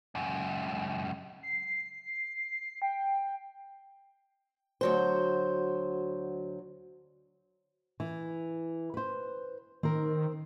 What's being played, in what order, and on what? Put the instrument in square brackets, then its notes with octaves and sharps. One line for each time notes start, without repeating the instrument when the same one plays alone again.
[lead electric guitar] C#2 F#2
[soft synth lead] C7
G5
[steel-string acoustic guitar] D2 F#3 C5
[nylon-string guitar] E3
B4 C5
[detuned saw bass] D#3 [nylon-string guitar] C4 A#4